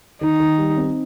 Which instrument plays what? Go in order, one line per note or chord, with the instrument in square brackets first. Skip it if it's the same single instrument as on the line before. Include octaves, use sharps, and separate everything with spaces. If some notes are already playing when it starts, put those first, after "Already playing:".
[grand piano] D#3 [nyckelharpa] D#4
[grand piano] D#3
G3
C4